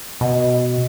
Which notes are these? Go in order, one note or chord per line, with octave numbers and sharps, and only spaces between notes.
B2 D#5